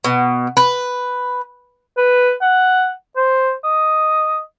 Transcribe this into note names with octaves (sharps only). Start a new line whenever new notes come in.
B2
B4
B4
F#5
C5
D#5